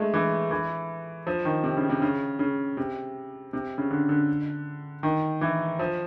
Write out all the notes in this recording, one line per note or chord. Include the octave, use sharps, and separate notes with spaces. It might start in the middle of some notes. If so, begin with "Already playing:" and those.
Already playing: G#3 A3
E3
E3
F3
D#3
C3
C#3
C3
C#3
C#3
C3
C3
C#3
D3
D3
D#3
E3
F3